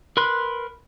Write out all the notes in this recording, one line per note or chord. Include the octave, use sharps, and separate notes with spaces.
A#4 B4 B5 C6 F#6